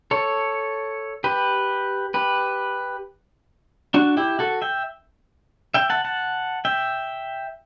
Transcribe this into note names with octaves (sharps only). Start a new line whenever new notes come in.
A4 C#5
G4 B4
G4 B4
D4 F#4
E4 G4
F#4 A4
E5 G5
E5 G5
F#5 A5
F#5 A5
E5 G5